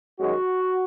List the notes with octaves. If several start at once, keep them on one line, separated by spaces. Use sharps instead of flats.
F#2 D#3 G#3 F#4